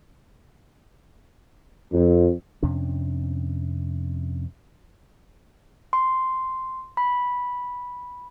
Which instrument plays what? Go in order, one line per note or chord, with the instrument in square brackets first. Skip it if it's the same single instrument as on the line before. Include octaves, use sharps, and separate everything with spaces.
[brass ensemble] F2
[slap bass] F2 C3 C#4 D4
[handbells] C6
B5